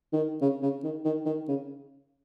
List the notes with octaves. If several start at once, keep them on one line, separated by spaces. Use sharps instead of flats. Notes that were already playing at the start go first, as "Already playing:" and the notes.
D#3
C#3
C#3
D#3
D#3
D#3
C#3